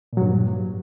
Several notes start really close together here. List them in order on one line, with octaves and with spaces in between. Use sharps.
A#2 F#3 G2